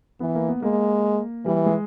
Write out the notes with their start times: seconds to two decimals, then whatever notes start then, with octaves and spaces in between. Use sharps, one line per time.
0.20 E3 B3
0.35 A#3
0.49 B3
0.62 G#3 A#3
1.45 E3 G3
1.66 G#3